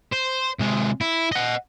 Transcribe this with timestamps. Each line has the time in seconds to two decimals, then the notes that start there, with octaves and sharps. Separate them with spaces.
0.12 C5
0.59 C3 G#3
1.01 E4
1.32 D#5 F#5